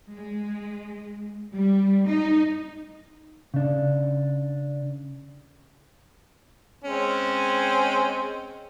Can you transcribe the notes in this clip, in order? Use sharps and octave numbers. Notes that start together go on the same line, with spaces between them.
G#3
G3
D#4
C#3 D4
G#3 C4 C#4